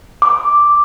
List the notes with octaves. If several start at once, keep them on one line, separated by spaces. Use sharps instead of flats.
D6